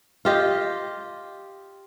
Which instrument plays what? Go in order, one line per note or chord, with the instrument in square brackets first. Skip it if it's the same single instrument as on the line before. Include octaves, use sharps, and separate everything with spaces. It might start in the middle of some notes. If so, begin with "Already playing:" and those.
[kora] F4 G4 D#5